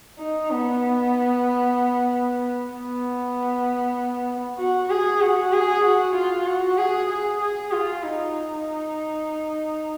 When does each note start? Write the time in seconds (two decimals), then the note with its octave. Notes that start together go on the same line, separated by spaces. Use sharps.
0.19 D#4
0.50 B3
2.70 B3
4.58 F#4
4.90 G#4
5.21 F#4
5.52 G#4
5.84 F#4
6.15 F4
6.46 F#4
6.78 G#4
7.09 G#4
7.40 G#4
7.72 F4
8.03 D#4